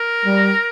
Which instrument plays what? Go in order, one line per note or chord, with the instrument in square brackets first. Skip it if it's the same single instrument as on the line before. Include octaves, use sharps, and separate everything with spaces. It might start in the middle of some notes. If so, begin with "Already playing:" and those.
Already playing: [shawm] A#4
[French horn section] G3